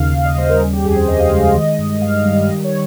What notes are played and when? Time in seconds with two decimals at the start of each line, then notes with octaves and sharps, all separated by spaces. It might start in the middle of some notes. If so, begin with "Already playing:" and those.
Already playing: D#2 C#3 F5
0.14 D#2 F5
0.25 D#5
0.37 G3 C5
0.49 A#4
0.61 C#3 G#4
0.73 G4
0.84 F2 G#4
0.96 C5
1.08 F2 D#5
1.20 F5
1.31 G#3 F5
1.54 D#3 D#5
1.78 G2
2.02 G2 F5
2.25 G3 F5
2.49 D#3 D#5
2.64 C#5